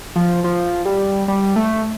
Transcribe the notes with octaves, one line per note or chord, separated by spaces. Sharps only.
F3
F3
G3
G3
A3